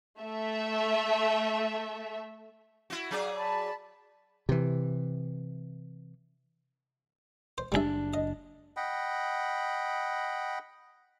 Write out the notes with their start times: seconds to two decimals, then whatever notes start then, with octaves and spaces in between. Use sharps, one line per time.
0.21 A3 E5
2.90 E4 F#4
3.11 F#3 G#4 D5 F5
3.37 A5 B5
4.49 C3 E3
7.58 C5
7.72 F#1 C#3 G3 D4 G#4 E5
8.14 D#5
8.77 D#5 F#5 G5 B5